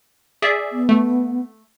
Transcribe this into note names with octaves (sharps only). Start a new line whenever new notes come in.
G#4 D5 E5
B3
A3